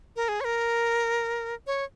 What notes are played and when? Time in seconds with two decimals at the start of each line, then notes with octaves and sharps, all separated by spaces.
0.16 A#4
0.28 G#4
0.41 C#5
0.44 A#4
1.67 C#5